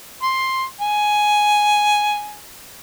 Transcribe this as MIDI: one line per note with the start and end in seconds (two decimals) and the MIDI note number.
0.22 0.65 84
0.81 2.39 80